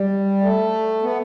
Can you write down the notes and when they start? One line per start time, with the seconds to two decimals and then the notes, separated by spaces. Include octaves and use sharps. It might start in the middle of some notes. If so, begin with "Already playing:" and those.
Already playing: G3
0.41 A3
1.02 B3